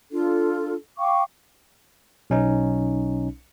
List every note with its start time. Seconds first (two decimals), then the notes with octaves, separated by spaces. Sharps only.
0.11 D4 F4 A4
0.98 F5 G5 C#6 D6
2.30 B1 C#4 D#4